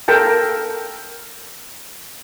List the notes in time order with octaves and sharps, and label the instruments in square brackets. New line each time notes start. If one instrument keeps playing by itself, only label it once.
[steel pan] A4 A#4 G5 A5